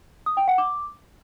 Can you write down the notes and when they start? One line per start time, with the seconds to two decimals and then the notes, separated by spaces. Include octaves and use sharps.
0.26 D#6
0.37 G5
0.48 F#5
0.58 D6